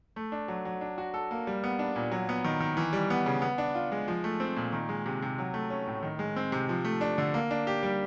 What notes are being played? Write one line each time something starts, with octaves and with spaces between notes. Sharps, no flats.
A3
D4
F#3
F#3
D4
F#4
A4
A#3
G3
B3
D4
A#2
F#3
B3
D#3
D#3
E3
G3
B3
C#3
B3
D4
F4
G#3
F3
A3
C4
A#2
D#3
G#3
C3
C3
F#3
A3
C#4
A2
D#3
G#3
C4
C3
F3
A3
D4
D3
A#3
D4
G4
G3